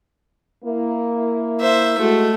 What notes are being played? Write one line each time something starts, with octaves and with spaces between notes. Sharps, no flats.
A#3 E4
C5 E5
G#3 A3 F#4